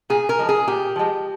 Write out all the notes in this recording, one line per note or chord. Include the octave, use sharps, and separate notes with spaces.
A#2 G#4
A#4
F3 G#3
G#4
A#2 G4
F3 G#3